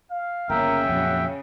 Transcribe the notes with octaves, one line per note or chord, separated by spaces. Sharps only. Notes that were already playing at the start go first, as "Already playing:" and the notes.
F5
G1 C#3 A#3 A#4 E5 G5
F2 A#2 F#3 F#5